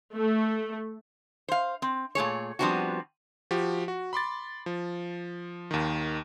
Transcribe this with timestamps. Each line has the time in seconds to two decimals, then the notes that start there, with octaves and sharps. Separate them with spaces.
0.15 A3
1.48 C5 F5
1.82 C4
2.15 A#2 A3 G#4 C#5
2.59 F3 G3 B3 C4 D4 F#4
3.51 F3 F#4 G4
3.88 F#4
4.13 B5 C6 D6 A6
4.66 F3
5.71 D#2 D#3